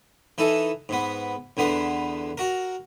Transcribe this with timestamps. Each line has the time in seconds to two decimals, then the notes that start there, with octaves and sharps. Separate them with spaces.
0.38 E3 D#4 A4
0.89 G#2 B3
1.57 E2 D3 B3 C6
2.38 F#4 A#4